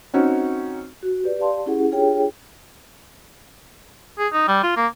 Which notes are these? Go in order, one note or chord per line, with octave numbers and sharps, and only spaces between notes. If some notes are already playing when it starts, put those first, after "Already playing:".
C4 C#4 D#4 F#4
F#4
G4 B4 D5
G4 D5 F5 A5 C6
C#4 E4 G4 G#4 F#5
D4 F4 G4 G#4 C#5 G5
G#4
D#4
G3
F4
A#3